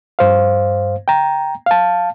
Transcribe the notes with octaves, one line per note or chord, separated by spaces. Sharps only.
G2 C5 F5
G5 A#5
F5 A5